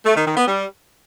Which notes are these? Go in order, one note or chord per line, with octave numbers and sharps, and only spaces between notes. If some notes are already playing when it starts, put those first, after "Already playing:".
A3
D#3
D#3
B3
G3